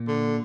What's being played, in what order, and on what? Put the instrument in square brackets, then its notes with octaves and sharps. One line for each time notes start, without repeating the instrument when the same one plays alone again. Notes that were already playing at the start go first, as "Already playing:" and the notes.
Already playing: [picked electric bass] A#2
[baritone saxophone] D3